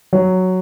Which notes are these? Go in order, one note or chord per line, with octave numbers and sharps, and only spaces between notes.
F#3